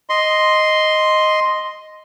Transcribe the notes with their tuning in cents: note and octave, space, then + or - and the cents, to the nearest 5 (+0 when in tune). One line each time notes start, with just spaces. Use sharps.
D#5 +0 C6 +0